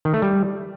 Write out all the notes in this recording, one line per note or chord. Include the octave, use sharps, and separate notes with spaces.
D#3
A3
G3